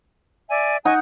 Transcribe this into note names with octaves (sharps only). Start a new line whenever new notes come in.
D5 E5 G#5
D#4 D#5 F#5 G#5 C#6